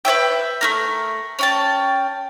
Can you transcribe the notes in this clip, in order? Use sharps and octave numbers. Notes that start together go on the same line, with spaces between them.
B4 C#5 E5 G5
A3 C#4 A#4
C#4 G5 A5